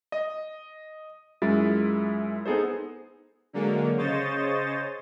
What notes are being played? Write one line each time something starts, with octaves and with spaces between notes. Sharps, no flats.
D#5
F#2 G#3 E4 F4 A6
B3 D#4 G#4 A4 C5
D3 F#3 G#3 A#3
C#3 C5 C#5 D#5 A6